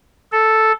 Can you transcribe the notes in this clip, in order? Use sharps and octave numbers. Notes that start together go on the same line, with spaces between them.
A4